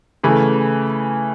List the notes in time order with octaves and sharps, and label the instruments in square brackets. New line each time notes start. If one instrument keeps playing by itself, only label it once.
[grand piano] C#3 E3 A3